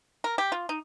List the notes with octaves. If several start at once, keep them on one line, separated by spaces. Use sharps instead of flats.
A#4
G4
F4
D#4